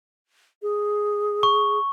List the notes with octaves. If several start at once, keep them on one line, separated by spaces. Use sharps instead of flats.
G#4
C#6